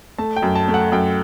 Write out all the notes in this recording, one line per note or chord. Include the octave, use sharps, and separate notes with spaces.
A3 A5
G5
F#2
A5
A3
F#5
F#2 G5